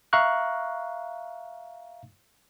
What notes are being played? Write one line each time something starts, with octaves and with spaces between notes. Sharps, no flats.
E5 F5 A#5 C#6 F#6